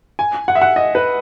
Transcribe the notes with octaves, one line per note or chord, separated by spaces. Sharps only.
G#5
F#5
E5
F#5
D#5
B4